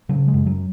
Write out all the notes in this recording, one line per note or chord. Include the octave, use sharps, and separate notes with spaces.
C#3 F#3
G#3
F#2
F#3